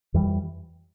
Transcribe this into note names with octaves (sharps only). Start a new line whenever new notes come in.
F2 E3 G3